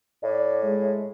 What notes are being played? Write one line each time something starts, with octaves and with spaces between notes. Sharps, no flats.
A2 D5
G#3